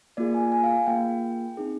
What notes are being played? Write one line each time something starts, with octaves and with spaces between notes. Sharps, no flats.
A#3 F4 G#4 D5
G#5
G#5
F5
A#3 F4 G#4 G5
C4 D#4 G#4